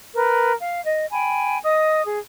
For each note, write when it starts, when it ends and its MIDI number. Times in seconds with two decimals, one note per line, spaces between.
0.14 0.53 70
0.14 0.53 71
0.57 0.82 77
0.84 1.06 75
1.12 1.58 79
1.12 1.58 80
1.12 1.58 83
1.64 2.04 75
1.64 2.04 87
2.06 2.19 68